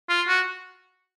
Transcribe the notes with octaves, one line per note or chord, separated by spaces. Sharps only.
F4
F#4